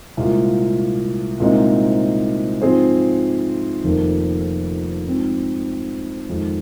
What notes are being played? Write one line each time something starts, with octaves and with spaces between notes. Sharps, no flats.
C2 A#2 G#3 F4
C2 A#2 G#3 C4 D#4
G#2 F3 C4 G#4 C5
F1 F2 D#3 A#3
G#2 F3 C4
F2 D#3 G#3